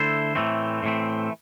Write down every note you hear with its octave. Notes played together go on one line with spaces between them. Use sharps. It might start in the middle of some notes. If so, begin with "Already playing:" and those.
Already playing: D3 A3 E4 A4 C5
A2 E3 A3 C4
A2 E3 A3 C4